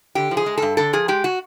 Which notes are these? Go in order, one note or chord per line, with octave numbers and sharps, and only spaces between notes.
D3 G4
F3
G#4
G#3
G2 A4
D3 A4
F3 G#4
G#3 G4
F#4